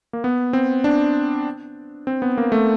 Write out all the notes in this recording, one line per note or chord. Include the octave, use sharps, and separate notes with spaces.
A#3
B3
C4
D4
C4
B3
A#3
A3